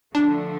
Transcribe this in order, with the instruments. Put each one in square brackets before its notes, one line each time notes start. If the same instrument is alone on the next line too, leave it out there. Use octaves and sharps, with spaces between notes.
[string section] D3 F3 A3 [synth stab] D4